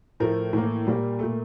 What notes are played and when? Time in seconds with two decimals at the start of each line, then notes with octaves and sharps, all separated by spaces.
0.20 A2 F3 A3 A#4
0.53 A2 E3 A#3
0.87 A#2 G3 A#3
1.19 A#2 A3